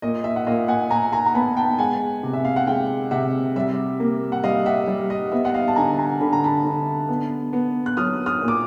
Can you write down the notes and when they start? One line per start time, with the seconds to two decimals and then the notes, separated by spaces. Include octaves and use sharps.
0.02 A#2 D#5
0.24 E5
0.36 F#5
0.47 A#2 D#5 F5
0.68 F#5 G#5
0.90 A#2 G#5 A#5
1.12 G#5 A#5
1.26 A#5
1.35 B3 A5 B5
1.57 G5 A5
1.78 G#3 F#5 G#5
2.23 C3
2.33 E5
2.45 F5
2.56 F#5
2.67 G#3 F5 G5
3.11 C3 E5 F#5
3.56 G3 E5
4.00 A#3
4.32 F#5
4.44 G3 D#5 F5
4.66 E5 F#5
4.87 G3
5.10 D#5
5.32 B3 E5
5.45 F#5
5.54 D#5 F5
5.68 A5
5.76 D3 G#5 A#5
5.93 A5
5.99 G#5 A#5
6.21 D3 B5
6.33 A#5
6.44 A5 B5
6.64 D3
7.09 B3
7.53 B3
7.86 F#6
7.97 F#3 D#6 F6
8.26 D#6 F6
8.41 A#2
8.48 D6